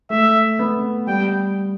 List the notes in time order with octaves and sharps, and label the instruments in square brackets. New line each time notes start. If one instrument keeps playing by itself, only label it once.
[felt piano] A3 [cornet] E5
[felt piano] B3
[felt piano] G3 [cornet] G5